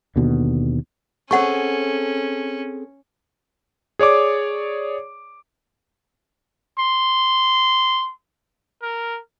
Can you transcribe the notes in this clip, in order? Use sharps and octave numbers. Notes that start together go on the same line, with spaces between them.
D#2 B2 D3
C4 C#4 G#4 A4 C#5 F#5 C#6
G#4 C#5 D5 D6
C6
A#4